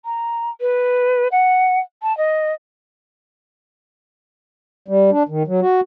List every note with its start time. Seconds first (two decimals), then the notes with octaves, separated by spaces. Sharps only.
0.05 A#5
0.61 B4
1.32 F#5
2.02 A5
2.18 D#5
4.88 G3
5.12 D4
5.29 D#3
5.47 F#3
5.61 F#4